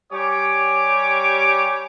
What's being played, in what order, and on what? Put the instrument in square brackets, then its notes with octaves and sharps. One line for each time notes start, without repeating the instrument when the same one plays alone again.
[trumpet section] G3 G4 C#5 G#5 D6